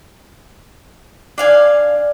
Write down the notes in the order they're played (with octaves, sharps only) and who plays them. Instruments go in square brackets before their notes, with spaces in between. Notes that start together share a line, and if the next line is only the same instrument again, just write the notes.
[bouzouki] D4 F5 G#5